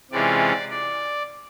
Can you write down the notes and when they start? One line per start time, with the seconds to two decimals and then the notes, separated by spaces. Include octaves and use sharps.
0.11 C3 E3 G#3 C#4 F4 D5
0.70 D5